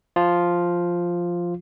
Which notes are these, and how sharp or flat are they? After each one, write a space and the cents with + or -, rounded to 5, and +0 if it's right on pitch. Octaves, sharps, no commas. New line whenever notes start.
F3 +0 F4 +0